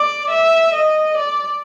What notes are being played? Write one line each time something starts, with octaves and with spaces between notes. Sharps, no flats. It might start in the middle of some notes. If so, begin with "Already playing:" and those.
Already playing: D5
E5
D#5
D5